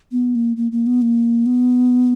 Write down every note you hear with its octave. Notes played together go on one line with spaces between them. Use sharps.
B3
A#3
A#3
A#3
B3
A#3
B3